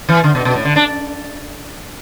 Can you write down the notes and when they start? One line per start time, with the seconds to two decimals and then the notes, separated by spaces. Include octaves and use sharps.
0.09 E3
0.24 D3
0.35 B2
0.45 B2
0.55 A2
0.65 D3
0.76 D4